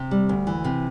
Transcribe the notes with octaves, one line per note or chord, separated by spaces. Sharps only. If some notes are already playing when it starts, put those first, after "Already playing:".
Already playing: C3
G3
D2
E3
C3